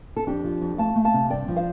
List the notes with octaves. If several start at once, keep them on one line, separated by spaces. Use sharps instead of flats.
A4
F2 D4 G4
F3
F2
A3 F5 A5
A3
F5 A5
C3
G2 D5 G5
F3
C5 F5